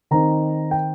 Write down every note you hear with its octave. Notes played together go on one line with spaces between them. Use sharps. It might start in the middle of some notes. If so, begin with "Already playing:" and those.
D#3 C4 D#4 A#5
G5